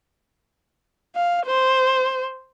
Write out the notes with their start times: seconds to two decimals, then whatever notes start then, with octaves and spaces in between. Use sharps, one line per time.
1.15 F5
1.46 C5